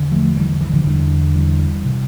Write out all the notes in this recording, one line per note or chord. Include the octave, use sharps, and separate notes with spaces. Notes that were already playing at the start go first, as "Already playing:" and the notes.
Already playing: E2 D3
F3 A3
E3 G3
E3
D3 F3
E2 D3 E3 G3
E3 G3
C3